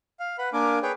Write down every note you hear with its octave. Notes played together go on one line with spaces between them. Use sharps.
F5
B4 F#5 B5
A#3 D4 A#4 G#5 D6
G#4 B4 C#5 G5